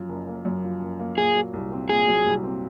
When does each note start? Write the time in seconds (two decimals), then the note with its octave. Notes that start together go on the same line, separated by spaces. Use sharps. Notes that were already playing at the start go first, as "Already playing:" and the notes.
Already playing: F#2 F3
0.09 F#1
0.27 A#3
0.45 F#2
0.64 F3
0.81 F#1
0.99 A#3
1.17 A#2 G#4
1.36 F#3
1.53 C2
1.72 C4
1.89 A#2 G#4
2.08 F#3
2.26 C2
2.44 C4